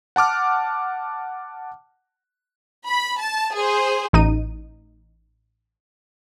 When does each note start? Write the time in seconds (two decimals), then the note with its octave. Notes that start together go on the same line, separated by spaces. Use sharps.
0.16 F#5 A5 D6 F6
2.88 B5
3.23 A5
3.56 G#4 C5
4.13 A1 D#4 D#7